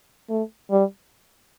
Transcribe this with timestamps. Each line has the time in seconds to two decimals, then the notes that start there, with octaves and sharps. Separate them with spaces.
0.29 A3
0.71 G3